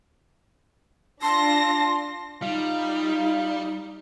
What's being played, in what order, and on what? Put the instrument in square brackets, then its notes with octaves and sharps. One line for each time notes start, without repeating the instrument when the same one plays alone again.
[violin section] D4 F4 A#6 [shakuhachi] A5 [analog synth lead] C6
[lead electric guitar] G3 [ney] D#4 [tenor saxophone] F4